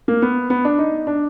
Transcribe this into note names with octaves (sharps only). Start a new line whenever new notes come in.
A#3
B3
B3
D4
D#4
D4